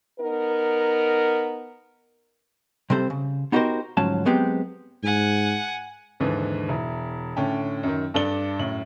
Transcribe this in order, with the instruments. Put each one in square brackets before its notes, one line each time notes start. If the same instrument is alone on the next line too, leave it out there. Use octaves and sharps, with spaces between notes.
[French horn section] B3 D#4 A#4
[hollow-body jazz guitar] C3 G3 C4 A4 C5
C#3
B3 D#4 F#4 G4 A#4 C5
D2 G#2 F3 F#3 C#4 A5
F#3 G#3 B3 C4 G4
[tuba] G#2 [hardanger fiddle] F#5 G#5
[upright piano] D#2 G#2 D3 E3
E1 E4
A2 D3 C#4 G5 A5
F#2 D#3
G2 D4 A4 D5 G7
F#2 A2 F#7